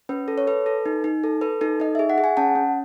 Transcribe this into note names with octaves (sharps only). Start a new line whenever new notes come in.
C#4 B4
A4
C#5
A4 B4
A4
D#4
D#4
A4
A4 B4
D#4 A4
D#4 D#5
G#4 E5
F#5
G#4
G#5
C#4 F#5 A5
C#4